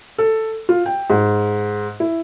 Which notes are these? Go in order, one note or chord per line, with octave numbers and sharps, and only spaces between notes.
A4
F4
G5
G#2
E4